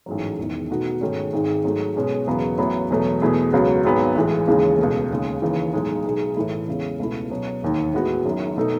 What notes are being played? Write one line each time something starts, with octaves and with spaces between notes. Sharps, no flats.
A1 G#2 F#3
E1 E2 D#3
B2 A3 D#4 F#4
G#2 D#3 A3 C#4 G#4
G#1 G#2 D#3 G#3
G#2 F#3 A3
B1 B2 G#3 C#4
E1 E2 C#3 F#3 B3
A1 A2 F#3 B3 E4
E1 E2 B2 F#3 A3
E2 B2 A3 E4 G#4
C#2 C#3 F#3 B3 F#4
G#1 G#2 F#3 B3
B1 A2 E3 G#3
D#2 C#3 E3 G#3
C#2 B2 A3
D#2 C#3 G#3
D#2 C#3 E3
B1 A2 G#3 D#4
B1 B2 G#3 D#4 G#4
A2 E3 A3 E4
E2 C#3 G#3
C#2 B2 A3 E4
B2 F#3 C#4
E1 D#2 D#3
A2 G#3 B3 F#4
F#1 F#2 D#3 F#3
B2 A3 D#4 A4